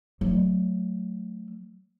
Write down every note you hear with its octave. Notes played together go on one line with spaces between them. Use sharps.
F#3 A3